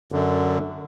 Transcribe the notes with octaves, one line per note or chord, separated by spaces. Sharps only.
F#2 D3